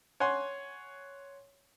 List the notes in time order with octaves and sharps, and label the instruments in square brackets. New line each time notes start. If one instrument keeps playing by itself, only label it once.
[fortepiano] C#5 F#5 G#5 C6